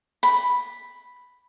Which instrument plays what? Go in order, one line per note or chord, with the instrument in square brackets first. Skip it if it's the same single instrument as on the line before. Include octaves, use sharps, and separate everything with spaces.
[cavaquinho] B5